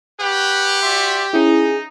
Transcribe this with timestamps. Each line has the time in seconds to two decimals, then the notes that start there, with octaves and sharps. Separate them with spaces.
0.20 G4 B4 C#5 F#5
0.83 F#4 D5 E5 C6
1.33 C#4 D#4 E4 G#4